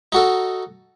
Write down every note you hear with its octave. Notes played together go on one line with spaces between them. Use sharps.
D#4 F#4 A4